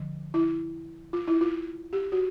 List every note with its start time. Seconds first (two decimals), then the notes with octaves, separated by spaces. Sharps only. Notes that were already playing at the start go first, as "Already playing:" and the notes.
Already playing: D3 F3
0.34 E4
1.13 F4
1.28 E4
1.41 F4
1.93 G4
2.12 F#4